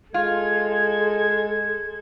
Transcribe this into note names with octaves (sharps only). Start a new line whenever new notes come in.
G#3 F4 A4 G#6